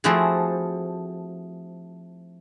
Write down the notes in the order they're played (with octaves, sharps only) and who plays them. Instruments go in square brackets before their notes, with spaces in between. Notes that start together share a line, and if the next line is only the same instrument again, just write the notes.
[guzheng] F3 A3 C4 E4 F#4 G#4